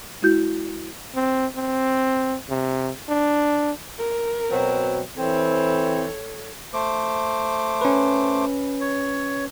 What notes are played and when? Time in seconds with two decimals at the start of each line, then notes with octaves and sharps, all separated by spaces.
0.22 G#3 E4 F#4 G6
1.15 C4
1.56 C4
2.50 C3
3.09 D4
3.98 A#4
4.51 B2 F#3 C4
5.18 E3 C4 A4 C#5
6.74 A3 C5 D6
7.81 C#4 B4
8.81 C#5